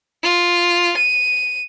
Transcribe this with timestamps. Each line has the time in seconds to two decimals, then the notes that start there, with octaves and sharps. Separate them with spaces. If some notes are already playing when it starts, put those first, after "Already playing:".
0.23 F4
0.97 D#7